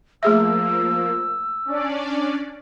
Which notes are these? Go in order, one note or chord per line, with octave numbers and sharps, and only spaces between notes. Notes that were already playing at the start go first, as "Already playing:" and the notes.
F3 A3 A#3 G#4 E5 E6
C#4 D4 D5